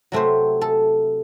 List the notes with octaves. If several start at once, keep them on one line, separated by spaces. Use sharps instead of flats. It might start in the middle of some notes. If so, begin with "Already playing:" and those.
C3 F#3 A3 C4 C5
A4